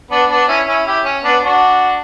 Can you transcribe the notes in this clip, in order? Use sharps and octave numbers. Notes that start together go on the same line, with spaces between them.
B3 D4
B3 D4
C#4 E4
C#4 E4
E4 G4
C#4
B3 D4
D4 F#4